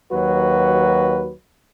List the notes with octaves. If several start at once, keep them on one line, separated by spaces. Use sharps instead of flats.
D#2 F#3 F#4 B4